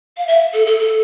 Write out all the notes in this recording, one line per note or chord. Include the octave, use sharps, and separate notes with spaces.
F5
E5
A4
A4
A4